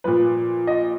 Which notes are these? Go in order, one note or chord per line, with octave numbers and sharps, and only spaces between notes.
A#2 F3 B4
D#5